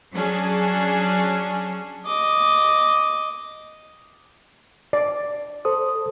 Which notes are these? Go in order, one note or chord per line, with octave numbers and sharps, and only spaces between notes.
F#3 C#4 D4 G#4
D#5 D6
D5
A4 C5 D#6